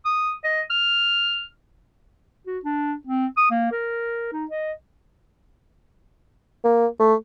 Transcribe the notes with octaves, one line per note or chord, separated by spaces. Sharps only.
D#6
D#5
F6
F#4
D4
C4
D#6
A#3
A#4
D#4
D#5
A#3
A3